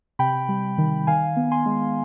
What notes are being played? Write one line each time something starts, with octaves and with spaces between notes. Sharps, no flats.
C3 G5 B5
G3
D#3
D#3 F5 G#5
B3
G#5 C6
G#3